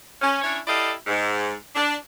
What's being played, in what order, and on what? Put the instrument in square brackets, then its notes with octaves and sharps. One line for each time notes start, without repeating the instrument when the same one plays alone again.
[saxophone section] C#4
C#4 D4 E4 C#5
E4 G4 A4 D5 D#5 F5
G#2
D4